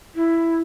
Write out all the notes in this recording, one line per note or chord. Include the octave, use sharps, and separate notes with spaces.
E4